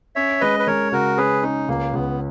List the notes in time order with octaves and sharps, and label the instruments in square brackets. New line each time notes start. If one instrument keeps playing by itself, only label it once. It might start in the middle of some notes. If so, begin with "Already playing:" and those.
[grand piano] C#4 [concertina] C#5 E5
[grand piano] G#3 [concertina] B4 D#5
[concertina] B4
[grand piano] G#3 [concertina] A#4 C#5
[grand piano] C#3 [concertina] F#4 A#4
[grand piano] C#4 [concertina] G#4 B4
[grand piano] C#4 [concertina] D#4
[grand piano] C#2 [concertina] A#3
[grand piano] C#2 [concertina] B3